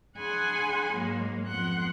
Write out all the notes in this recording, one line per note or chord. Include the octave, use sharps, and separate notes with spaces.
D4 G#4 F#5 G#5 B5 C6
G#2 F#3 G#3 A#3
F2 F3 B3 F#5 C6 F#6